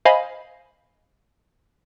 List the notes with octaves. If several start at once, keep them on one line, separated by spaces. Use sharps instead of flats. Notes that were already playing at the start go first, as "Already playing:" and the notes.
C5 D#5 F5 G#5 B5